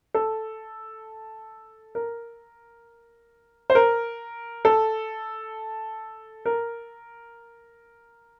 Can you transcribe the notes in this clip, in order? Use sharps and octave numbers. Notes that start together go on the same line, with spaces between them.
A4
A#4
C5
A#4
A4
A#4